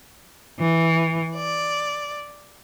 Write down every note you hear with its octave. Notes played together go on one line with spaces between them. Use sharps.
E3
D5